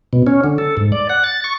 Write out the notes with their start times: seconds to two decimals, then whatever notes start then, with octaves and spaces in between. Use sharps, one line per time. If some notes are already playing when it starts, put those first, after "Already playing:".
0.13 B2
0.27 C#4
0.44 D3
0.58 A4
0.77 G#2
0.92 D5
1.09 F#5
1.24 A6
1.44 C#6